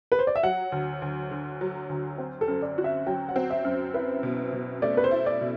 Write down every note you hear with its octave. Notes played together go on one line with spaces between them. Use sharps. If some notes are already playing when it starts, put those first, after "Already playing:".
B4
C5
D5
E5
F#3 F#5
D2
D2
D3
F#3
D2
C4
A4
F#2
D5
F#4
E5
F#3 G5
F#5
C4
E5
F#2
E4 B4
B2
B2
A3 D5
B4
C5
E4
D5
B2